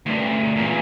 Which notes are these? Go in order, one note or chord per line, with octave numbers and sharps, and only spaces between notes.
D2 G2
E2 A#2